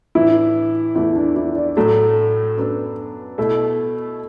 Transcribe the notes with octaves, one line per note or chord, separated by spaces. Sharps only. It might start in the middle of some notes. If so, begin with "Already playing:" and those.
A2 E3 D4 E4
E2 E3 A3 E4
D4
E4
D5
A2 F#3 A3 A4
F#2 F#3 B3 D4
B2 A3 E4 A4